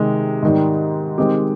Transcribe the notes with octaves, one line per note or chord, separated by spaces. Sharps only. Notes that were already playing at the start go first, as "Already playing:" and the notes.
Already playing: C3 D#3 G#3
G#2 D#3 G3
D#3 G#3 C4 G4